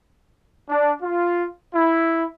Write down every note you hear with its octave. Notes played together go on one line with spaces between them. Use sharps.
D4
F4
E4